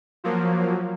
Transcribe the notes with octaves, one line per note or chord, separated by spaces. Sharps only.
F3 F#3 A#3